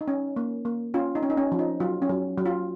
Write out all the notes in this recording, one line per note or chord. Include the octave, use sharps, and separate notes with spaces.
D#4
C#4
A#3
A#3
C#4 F4
D#4
C#4
D#4
C#4
F3
D#4
F#3 F4
C#4
F#3
F#3
F4